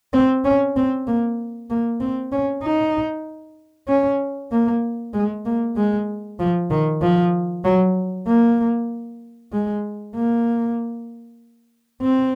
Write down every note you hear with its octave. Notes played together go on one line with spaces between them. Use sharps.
C4
C#4
C4
A#3
A#3
C4
C#4
D#4
C#4
A#3
G#3
A#3
G#3
F3
D#3
F3
F#3
A#3
G#3
A#3
C4